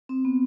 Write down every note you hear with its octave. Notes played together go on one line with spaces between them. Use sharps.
C4
B3